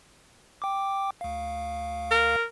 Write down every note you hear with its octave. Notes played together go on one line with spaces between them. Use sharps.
G5 D6
D2 F5
A#4